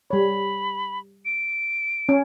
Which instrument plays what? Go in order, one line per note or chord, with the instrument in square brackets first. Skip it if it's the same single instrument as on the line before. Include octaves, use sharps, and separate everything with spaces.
[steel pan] G3 C#5 [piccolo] B5
[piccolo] D7
[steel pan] C#4